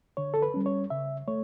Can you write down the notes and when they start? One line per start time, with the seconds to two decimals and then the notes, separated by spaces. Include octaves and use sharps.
0.17 D3 C#5
0.34 A4
0.42 B4
0.54 G3 C#4
0.66 C#5
0.90 C#3 E5
1.28 A3 C#5